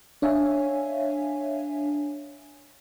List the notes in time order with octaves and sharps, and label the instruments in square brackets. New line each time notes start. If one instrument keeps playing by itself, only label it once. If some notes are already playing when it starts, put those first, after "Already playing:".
[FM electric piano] D4 C#5 E5 F5 G#5